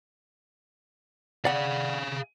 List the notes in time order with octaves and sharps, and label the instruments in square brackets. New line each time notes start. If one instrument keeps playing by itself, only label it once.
[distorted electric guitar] G#4 F5 [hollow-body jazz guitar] D5 F#5